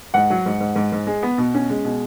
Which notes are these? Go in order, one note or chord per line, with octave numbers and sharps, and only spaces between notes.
G#2 F#5
F#3
G#2
G#2
G#2
G#2
G#3
B3
B2
C#4
G#3
B2